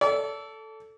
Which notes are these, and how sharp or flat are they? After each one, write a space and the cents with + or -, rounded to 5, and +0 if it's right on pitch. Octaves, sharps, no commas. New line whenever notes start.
A4 +0 D5 -40